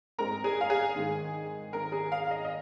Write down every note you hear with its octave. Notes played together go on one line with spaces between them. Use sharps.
G#2 G#3 C4 A#4 A#5
G#4 G#5
F5
G#4 G#5
G#2 D#3 G#3
G#1 G#2 D#3 A#4 A#5
G#4 G#5
F5
F5
D#5
D#5